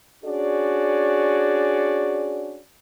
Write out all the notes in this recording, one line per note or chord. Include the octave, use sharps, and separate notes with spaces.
C#4 D4 F#4 G#4 D5